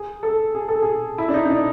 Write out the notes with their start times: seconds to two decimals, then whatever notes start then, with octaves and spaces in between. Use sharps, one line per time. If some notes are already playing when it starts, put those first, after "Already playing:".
Already playing: G#4
0.23 A4
0.55 G#4
0.68 A4
0.82 G#4
1.18 E4
1.28 D4
1.34 D#4
1.45 D#4
1.50 D4